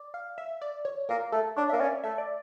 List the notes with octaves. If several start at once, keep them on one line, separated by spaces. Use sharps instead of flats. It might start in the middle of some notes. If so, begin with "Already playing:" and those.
Already playing: D5
F5
E5
D5
C#5
A#3 A#4
A3 A4
D4 C#5
A#3 E5
C#4 D5
A3 E5
D5